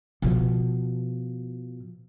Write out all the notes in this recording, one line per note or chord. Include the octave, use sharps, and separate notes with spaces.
B2 F3